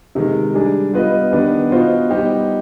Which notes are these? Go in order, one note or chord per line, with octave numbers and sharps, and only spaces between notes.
C3 D#3 G#3
G3 D4 G#4
G3 B3 F4 B4 D#5
D#3 B3 D4 G4 B4
B2 B3 F4 C5 D#5
G3 B3 D#4 G4 C5